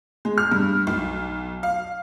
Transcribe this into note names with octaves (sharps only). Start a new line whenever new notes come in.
G#3
F6
G2
B1
F5